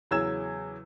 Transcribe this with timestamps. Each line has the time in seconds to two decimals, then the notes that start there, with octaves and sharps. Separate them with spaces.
0.11 E2 C#3 F#3 E6 G#6 E7